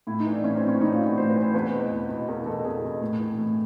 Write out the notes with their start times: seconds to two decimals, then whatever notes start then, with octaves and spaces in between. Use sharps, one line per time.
0.07 A2 E4
0.20 D#4
0.26 E3
0.32 D4
0.44 A2 C#4
0.56 C4
0.63 E3
0.68 C#4
0.76 D4
0.81 A2 D#4
0.93 F4
0.98 E3
1.05 F#4
1.17 A2 C5
1.29 B4
1.36 E3
1.42 C5
1.54 E2 B4
1.73 B2
1.91 E2
2.09 B2
2.28 E2 A#4
2.46 B2 A4
2.64 E2 G#4
2.83 B2
3.01 A2
3.20 E3
3.38 A2